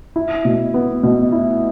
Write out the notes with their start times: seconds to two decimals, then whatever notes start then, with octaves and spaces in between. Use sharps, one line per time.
0.16 E4
0.45 B2
0.74 B3
1.03 B2
1.32 E4